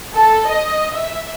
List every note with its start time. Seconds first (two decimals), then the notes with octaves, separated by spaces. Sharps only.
0.14 A4
0.48 D#5
0.95 E5